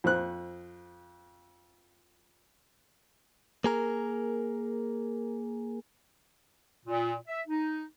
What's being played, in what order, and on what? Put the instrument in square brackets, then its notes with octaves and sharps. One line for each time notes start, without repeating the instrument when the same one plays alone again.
[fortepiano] F2 C5 F#6
[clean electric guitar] A#3 G#4 A#4
[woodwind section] A#2
E5
D#4